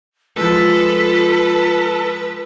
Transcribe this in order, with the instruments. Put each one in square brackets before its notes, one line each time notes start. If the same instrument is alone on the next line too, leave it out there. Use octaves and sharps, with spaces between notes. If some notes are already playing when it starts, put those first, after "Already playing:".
[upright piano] F3 G#3 [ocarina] F4 [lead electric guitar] A4 [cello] B4